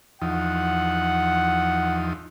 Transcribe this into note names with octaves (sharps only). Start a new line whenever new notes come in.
E2 F3 D#4 F#5